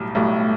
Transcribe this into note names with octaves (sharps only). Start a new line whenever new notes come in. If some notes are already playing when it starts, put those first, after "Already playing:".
Already playing: B1 A2 G3
B1 A2 G3 A3